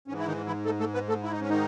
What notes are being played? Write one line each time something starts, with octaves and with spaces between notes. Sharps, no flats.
G#2 E3 C#4
E4
D#3 D#4
E3 E4
A3 A4
A3 A4
B3 B4
A3 A4
E4
D#4
C#4
D#3 D#4